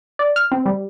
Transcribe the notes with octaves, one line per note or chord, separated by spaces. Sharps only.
D5
F6
C4
G3